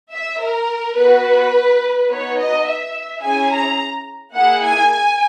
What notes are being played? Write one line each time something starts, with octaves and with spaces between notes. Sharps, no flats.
E5
A#4
B3 F#4 B4
B3 D#4 F#4 C#5
D#5
E5
C#4 E4 G#4 G#5
A#5
A#3 E4 G#4 F#5
G#5
G#5